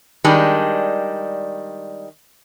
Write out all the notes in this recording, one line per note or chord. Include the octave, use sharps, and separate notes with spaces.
D#3 G3 G#3 D4